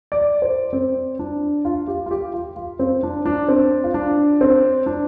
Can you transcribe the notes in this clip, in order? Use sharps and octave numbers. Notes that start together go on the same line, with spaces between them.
D5
C5
C4
D4
F4
G4
F4
G4
F4
F4
C4
D4
D4
C4
F4
D4
C4
D4